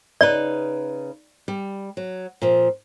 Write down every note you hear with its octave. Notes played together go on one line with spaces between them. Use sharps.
C#3 D#4 B4 D5
G3
F#3
A#2 F3